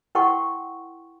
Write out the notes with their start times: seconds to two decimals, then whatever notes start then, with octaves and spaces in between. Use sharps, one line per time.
0.15 E4 A#4 F#5 G5 C6 C#6